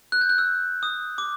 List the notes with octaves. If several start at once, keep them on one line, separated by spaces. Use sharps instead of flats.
F#6
G6
F#6
E6
D#6
D6